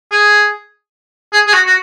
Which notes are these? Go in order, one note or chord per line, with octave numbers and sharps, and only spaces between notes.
G#4
G#4
G#4
F#4
F#4